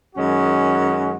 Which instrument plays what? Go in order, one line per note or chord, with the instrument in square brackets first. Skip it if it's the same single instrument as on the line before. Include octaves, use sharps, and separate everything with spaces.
[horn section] F#2 D#3 G#3 C#4 F#4